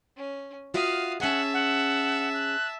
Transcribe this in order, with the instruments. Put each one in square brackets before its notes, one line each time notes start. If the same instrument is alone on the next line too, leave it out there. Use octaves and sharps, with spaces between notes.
[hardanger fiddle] C#4
[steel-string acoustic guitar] F4 F#4 E5 [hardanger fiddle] F5 D#6
[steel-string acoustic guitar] C#4 G#4 [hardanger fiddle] E5 A5 [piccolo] F#5
[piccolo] F#5
F#6